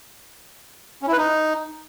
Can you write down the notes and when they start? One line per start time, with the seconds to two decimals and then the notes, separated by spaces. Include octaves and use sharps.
1.02 C#4
1.07 E4
1.12 B4
1.18 D#4